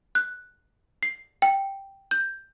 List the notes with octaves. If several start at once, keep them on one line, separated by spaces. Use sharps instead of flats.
F#6
C7
G5
G6